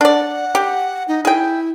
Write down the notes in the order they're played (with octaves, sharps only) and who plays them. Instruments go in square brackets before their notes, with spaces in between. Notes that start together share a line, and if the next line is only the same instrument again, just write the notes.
[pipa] D4 D5 [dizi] F#5
[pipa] G4
[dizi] D#4
[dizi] E4 [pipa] G#4 G5